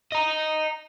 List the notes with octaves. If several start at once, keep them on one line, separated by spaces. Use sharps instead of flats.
D#5 A#5